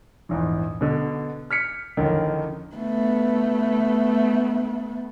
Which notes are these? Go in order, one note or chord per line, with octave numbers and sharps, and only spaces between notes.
A#1 E2 G#2
B2 D3
F6 B6 C#7
A1 F2 D3 D#3
A3 B3